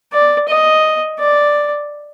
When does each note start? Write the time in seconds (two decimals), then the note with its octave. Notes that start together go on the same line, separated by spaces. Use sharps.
0.12 D5
0.48 D#5
1.20 D5